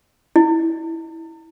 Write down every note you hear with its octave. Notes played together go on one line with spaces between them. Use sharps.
E4